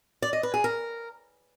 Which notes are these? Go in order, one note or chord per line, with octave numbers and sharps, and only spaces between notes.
D5
D#5
B4
G#4
A#4